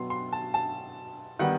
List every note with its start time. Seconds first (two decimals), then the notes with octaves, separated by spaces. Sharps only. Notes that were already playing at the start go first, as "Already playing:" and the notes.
Already playing: B2 F#3 B3 C6
0.10 C6
0.33 A5
0.54 A5
1.39 D#3 G3 B3 F#5